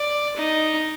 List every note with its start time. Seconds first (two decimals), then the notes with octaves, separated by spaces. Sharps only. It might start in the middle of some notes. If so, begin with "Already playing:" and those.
Already playing: D5
0.36 D#4